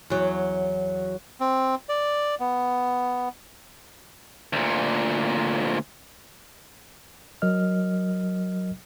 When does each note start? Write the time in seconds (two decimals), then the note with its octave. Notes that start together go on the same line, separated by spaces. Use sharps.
0.10 E2 F#3
1.40 C4
1.89 D5
2.40 B3
4.53 D2 A#2
7.42 F#3 A#4 D#5 F6